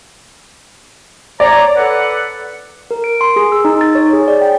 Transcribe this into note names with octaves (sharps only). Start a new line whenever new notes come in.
C#5 D5 A#5
A4 B4 F#5
A#4
D7
C6
G#4
E6
D#4
A6
C#5
G#4
D5
G5